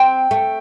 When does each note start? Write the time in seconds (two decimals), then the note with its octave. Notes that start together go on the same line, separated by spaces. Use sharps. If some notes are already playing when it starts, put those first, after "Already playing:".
Already playing: C4 G5
0.31 A3